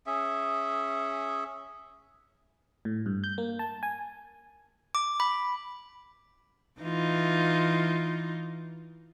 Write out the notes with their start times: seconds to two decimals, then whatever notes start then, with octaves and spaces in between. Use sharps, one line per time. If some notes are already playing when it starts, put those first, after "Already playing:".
0.06 C#4 G#4 E5
2.85 A2
3.06 G2
3.24 G6
3.38 A#3
3.59 A5
3.83 G#5
4.95 D6
5.20 B5
6.81 E3 D#4 F4